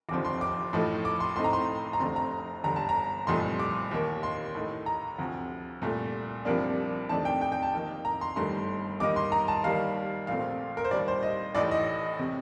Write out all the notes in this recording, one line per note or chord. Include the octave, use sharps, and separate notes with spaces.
F1 D#2 D3 F3 C4 D6
C6
D6
A2 F3 A3 D#4
D6
C6
A2 A3 C4 D#4 C6
A#5
C6
A#5
F1 F2 D3 A3 C4 C6
A#5
G1 G2 D3 A#5
A5
A#5
C2 A#2 F3 A3 D#4 C6
D6
D#2 D#3 A#3
C6
A2 A3 D#4
A#5
D2 C3 F3
C2 A#2 A3
C2 C3 F3 A#3 D4
F2 C3 D#3 A3 D4 A5
G5
G5
G5
A5
F2 D#3 A#3
A#5
C6
G1 G2 D#3 A3 C6
G2 D#3 A#3 D#4 D6
C6
A#5
A5
D#2 D#3 G3 A#3 F5
A#1 A#2 A3 C4 F5
A#4
C5
D#2 D#3 G3 D5
C5
D#5
A1 A2 A3 D#4 D5
D#5
C3